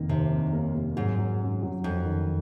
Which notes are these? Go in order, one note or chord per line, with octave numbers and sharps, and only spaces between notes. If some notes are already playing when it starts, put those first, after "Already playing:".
Already playing: F1 D#3 A#3
D#2 C3
F1
A#3
A#3
G#2 F#3
F#3
F#2
F#3
F2 F#3
D#3